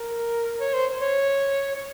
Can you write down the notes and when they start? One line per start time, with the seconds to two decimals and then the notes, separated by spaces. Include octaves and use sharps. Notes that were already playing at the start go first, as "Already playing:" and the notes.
Already playing: A#4
0.60 C#5
0.73 C5
1.01 C#5
1.75 C#5